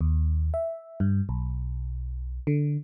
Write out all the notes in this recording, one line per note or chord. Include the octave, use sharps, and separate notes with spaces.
D#2
E5
G2
B1
D3